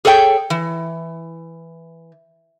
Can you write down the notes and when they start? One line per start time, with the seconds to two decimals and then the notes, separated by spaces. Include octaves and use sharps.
0.05 G#4 A4 C#5 F5 G5
0.50 E3